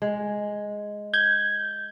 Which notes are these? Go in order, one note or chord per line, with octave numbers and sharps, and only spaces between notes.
G#3
G6 G#6